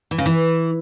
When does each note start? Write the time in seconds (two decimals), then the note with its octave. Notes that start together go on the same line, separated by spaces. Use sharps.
0.11 E3
0.18 C#3
0.26 E3